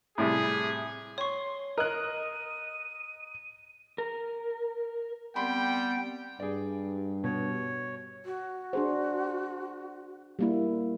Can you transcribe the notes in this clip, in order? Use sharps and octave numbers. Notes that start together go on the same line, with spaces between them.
A2 C3 G3 G#4
C#5 C6 C#6
A#4 D#5 F#6 D#7
A#4
G3 B3 C4 G5 B5 C6
G2 G#4 D5
B2 C#5
F#4
D4 G#4 C5
G3 A#3 E4